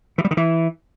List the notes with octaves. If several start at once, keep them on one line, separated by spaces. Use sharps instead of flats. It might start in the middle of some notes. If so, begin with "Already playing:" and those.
E3
G3
D#3
E3